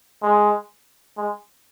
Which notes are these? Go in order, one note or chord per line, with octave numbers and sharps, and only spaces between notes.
G#3
G#3